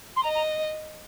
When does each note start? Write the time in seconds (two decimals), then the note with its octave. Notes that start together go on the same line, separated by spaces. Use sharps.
0.16 C6
0.23 D#5 A#5
0.35 A#5